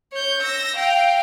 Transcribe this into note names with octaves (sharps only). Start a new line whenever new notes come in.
C#5 G6
E6 A#6
F5 G5